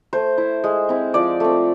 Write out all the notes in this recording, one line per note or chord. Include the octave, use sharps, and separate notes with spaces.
A3 C5
E4
G#3
C4 E4
F3 D5
A3 C4